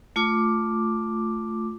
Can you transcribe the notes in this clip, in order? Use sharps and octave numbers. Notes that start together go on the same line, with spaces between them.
A3 F4 D6